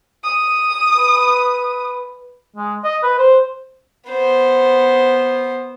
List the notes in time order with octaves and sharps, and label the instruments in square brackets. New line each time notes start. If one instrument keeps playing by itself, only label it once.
[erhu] D#6
[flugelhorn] B4
[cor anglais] G#3
D#5
B4
C5
[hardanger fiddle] B3 C5